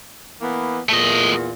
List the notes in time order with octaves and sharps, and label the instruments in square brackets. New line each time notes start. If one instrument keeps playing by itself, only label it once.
[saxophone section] E3 A#3 B3
[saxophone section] E2 A#2 [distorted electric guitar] A3 D#5